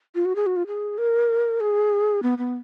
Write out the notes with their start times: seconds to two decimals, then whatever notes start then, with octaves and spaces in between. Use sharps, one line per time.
0.15 F4
0.25 F#4
0.36 G#4
0.46 F#4
0.56 F4
0.67 G#4
0.98 A#4
1.60 G#4
2.23 B3
2.38 B3